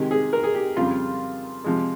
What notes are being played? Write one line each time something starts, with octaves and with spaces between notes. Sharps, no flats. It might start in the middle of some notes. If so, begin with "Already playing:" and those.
Already playing: C3 D#3 G#3 G4
G#4
A#4
G#4
G4
F2 C#3 G3 F4
C3 F3 G#3